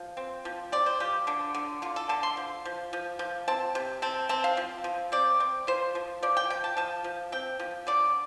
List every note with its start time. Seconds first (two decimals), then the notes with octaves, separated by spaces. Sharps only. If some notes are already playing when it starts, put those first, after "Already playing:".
Already playing: F3
0.17 C4
0.45 F3
0.72 C4 D5
0.86 C5
1.00 F3 G4
1.27 D3 D4
1.55 D3
1.82 D3 F4
1.96 A4
2.09 D3 A5
2.23 C6
2.37 F3
2.65 F3
2.93 F3
3.19 F3
3.48 C4 A5
3.75 C3
4.02 C4 A5
4.29 C4 A5
4.44 F5
4.57 F3
4.84 F3
5.12 C4 D5
5.40 C4
5.67 F3 C5
5.95 F3
6.22 F3 D5
6.37 G5
6.50 F3 G5
6.64 A5
6.77 F3 A5
7.04 F3
7.32 C4 G5
7.60 F3
7.87 D3 D5